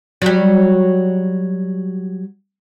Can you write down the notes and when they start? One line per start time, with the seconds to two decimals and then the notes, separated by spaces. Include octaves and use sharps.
0.22 F#3 G3